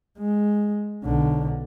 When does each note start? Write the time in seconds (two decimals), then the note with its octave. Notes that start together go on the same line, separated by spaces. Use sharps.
0.19 G#3
1.04 B1 D3